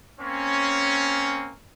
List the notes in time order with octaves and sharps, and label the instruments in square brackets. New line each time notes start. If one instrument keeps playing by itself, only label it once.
[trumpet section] A#3 C4 C#4